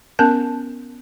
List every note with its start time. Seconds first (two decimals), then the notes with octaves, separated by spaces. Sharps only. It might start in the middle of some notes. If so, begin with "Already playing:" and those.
0.19 B3 C#4 A#4 A5